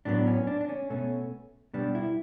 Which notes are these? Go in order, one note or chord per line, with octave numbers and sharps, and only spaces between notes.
A2 F#3 B3 D4
C#4
D4
D4
C#4
B2 A3 C#4
B2 G3 B3 D4
E4